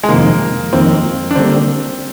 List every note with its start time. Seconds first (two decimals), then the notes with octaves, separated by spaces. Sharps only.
0.03 G#3
0.08 F2 C3 D#3 A#3
0.73 F2 D#3 A#3 C4
1.31 D4
1.35 D3 G3 A#3 C4